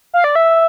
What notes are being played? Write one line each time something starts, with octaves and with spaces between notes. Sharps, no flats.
F5
D5
E5